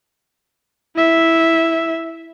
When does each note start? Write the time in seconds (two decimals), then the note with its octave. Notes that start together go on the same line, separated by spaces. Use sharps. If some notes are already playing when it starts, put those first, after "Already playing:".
0.96 E4 E5